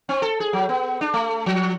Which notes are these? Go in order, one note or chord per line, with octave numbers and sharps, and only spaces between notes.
C4
A4
G#4
F#3
B3
D4
A3
F3